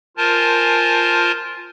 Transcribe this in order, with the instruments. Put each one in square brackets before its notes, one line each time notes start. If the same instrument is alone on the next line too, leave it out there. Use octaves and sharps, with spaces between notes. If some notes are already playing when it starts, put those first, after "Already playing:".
[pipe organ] F4 A#4 C5 G#5 A5